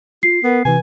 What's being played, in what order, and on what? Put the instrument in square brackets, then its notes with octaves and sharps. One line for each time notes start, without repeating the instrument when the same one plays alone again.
[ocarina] F4 [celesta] C7
[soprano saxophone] B3 [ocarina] A#4
[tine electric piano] C3 E3 [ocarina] B4 [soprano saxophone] G#5